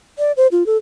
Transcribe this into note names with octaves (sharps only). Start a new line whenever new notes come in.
D5
C5
F4
A4